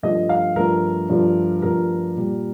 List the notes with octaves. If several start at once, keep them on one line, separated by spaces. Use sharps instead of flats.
G2 F3 A3 D#5
F5
G2 F3 A3 A#4
G2 F3 A3
G2 F3 A3 A#4
A#2 G3